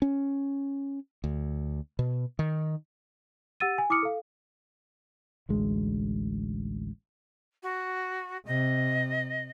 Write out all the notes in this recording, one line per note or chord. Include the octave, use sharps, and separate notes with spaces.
C#4
D2
B2
D#3
G4 F#5 E6 A6 D#7
G#5
E4 D6 D#6 F6 C#7
A4 F5
A1 D2 G#3
F#4
C3 D#5